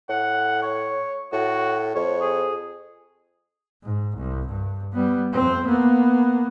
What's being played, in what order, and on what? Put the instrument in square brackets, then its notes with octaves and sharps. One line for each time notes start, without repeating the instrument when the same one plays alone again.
[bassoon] A2 [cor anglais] F#5
[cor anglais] C#5
[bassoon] A2 [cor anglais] F#4
[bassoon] F2 [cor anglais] C#5
[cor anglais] G#4
[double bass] G#2
C2
G2
G3 B3
F2 C4
A#3 B3